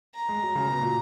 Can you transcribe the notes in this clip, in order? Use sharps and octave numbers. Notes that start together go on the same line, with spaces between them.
A#5
G#3
F#3
C#3
B2
A#2